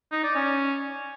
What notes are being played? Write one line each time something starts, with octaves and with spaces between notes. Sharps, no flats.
D#4
D5
C#4